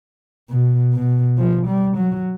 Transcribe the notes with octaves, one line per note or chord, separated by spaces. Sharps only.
B2
B2
F3
G3
F#3